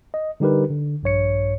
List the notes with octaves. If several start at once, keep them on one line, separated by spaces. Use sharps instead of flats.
D#5
D3 G3 D#4 G4 A#4 B4
D3
A#1 G2 C#5 C#7